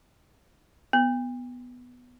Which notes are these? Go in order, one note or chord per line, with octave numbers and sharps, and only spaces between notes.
B3